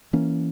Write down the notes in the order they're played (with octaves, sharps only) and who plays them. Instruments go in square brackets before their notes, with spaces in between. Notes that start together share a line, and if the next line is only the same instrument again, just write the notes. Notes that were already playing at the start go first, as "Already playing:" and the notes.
[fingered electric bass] E3 A#3 C#4